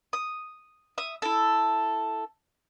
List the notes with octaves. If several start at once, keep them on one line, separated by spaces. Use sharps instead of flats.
D#6
E5 D#6
E4 A4